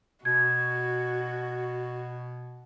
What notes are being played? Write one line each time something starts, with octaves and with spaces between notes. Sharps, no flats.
B2 F#4 G#6